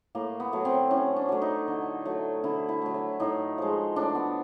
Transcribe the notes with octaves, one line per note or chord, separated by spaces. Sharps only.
A2 A#3
B3
F#3 A3
C4
A2 C#4
D4
F#3 A3
D#4
D3
F#3 A3
D3 E4
E4
F#3 A3
E4
A2 D#4
F3 G#3
A2 D4
B3